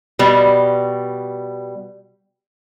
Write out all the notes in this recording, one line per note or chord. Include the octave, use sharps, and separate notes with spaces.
B2 G3